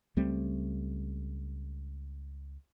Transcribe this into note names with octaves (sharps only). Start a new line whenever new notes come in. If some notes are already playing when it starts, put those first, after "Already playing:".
C#2 G3 A3 C4